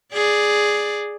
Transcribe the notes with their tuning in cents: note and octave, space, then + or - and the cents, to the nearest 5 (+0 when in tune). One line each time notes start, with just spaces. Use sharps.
G#4 +0 D5 +0